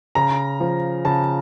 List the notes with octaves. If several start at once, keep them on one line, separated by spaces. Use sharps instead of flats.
C#3 A#5
F3
C#3 A5